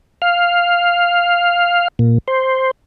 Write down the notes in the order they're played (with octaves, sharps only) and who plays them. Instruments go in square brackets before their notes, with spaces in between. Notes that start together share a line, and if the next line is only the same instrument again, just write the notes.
[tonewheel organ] F5
A#2
C5